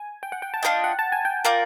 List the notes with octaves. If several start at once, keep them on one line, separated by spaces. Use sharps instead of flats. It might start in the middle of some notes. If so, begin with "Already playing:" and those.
Already playing: G#5
G5
F#5
G5
A5
D4 F4 A#4 D#5 G5
F#5
A5
G#5
G5
F4 A#4 D5